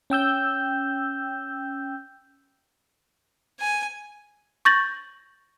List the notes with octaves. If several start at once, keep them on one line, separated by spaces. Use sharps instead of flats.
C#4 G5 E6 G6
G#5
C#6 G6 A6 A#6 F#7